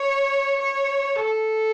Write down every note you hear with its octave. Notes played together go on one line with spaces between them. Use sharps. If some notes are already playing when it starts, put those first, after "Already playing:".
Already playing: C#5
C#5
A4